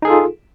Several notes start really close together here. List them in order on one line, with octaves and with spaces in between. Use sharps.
D#4 G#4 A4 F4